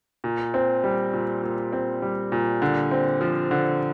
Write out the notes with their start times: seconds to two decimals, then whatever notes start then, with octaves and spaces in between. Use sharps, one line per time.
0.24 A#2
0.54 C4
0.84 G3
1.13 A#2
1.43 A#2
1.73 C4
2.02 G3
2.32 A#2
2.62 D3
2.91 C4
3.21 F3
3.51 D3